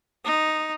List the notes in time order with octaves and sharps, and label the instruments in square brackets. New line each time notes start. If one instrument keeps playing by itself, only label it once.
[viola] D#4